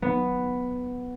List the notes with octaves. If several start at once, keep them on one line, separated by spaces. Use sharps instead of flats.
B3